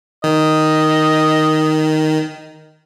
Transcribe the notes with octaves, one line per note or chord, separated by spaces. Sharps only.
D#3 D#5